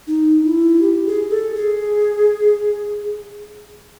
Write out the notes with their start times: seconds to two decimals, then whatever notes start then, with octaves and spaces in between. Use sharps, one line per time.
0.07 D#4
0.44 E4
0.81 G4
1.06 G#4
1.30 A4
1.55 G#4